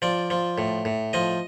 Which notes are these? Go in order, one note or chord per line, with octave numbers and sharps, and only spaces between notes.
F3 D5
F3
A2
A2
F3 D#5